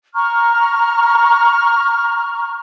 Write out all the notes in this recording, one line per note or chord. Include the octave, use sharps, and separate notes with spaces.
A#5 C#6 F6